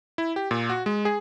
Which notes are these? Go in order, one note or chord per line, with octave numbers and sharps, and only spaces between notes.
E4
G4
A#2
F#4
G#3
G#4